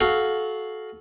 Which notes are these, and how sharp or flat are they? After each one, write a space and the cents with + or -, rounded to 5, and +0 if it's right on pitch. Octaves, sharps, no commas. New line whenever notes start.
F#4 +0 A4 -25 F5 +0